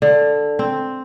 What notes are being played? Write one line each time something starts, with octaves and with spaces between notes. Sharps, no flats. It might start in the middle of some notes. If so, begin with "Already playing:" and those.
D3
C4